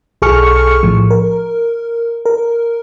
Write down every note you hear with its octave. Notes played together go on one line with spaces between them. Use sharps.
B1 G#4 A4 C#6 F6 C#7
A2 F3
A#4
A#4